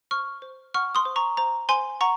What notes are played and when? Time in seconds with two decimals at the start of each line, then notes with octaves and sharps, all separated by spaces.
0.11 C5 C#6 F6
0.42 C5
0.74 F#5 C#6 F6
0.95 C6 D#6
1.05 C5
1.16 A#5 C#6
1.37 C5 A#5
1.69 C5 G#5 C6
2.01 F#5 A#5 C#6